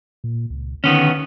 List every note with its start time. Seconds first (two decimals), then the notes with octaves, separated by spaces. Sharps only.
0.24 A#2
0.50 C#2
0.84 D3 D#3 B3 C#4